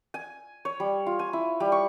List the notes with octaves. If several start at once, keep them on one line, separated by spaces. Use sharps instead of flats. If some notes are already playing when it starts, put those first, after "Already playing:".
G#5
C#5
G3
F4
G#5
E4
G3
C#6